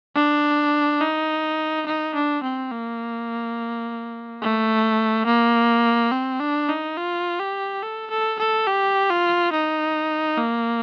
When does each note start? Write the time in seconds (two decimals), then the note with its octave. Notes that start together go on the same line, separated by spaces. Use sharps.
0.15 D4
1.01 D#4
1.86 D#4
2.14 D4
2.43 C4
2.71 A#3
4.41 A3
5.26 A#3
6.12 C4
6.40 D4
6.69 D#4
6.97 F4
7.40 G4
7.83 A4
8.11 A4
8.40 A4
8.67 G4
9.10 F4
9.52 D#4
10.38 A#3